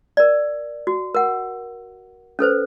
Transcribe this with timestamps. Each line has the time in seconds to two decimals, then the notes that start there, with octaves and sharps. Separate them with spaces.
0.17 A#4 D5
0.87 F#4
1.15 A#4 F#5
2.39 C#4 A4 B4 C5